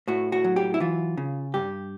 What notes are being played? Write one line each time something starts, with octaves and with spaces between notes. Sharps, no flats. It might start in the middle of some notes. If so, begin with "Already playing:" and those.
A2 F#4
F#4
F#3
G4
E4
E3 F4
C#3
G2 G4